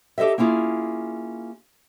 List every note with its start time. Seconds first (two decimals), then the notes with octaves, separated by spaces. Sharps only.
0.18 G4 A4 C5 D#5 E5
0.38 A#3 C#4 E4 F4 G#4